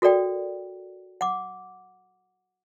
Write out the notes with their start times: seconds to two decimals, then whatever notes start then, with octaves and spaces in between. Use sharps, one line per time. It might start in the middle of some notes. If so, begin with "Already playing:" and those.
0.02 F#4 A4 A#4 D5 G5
1.21 F#5 D6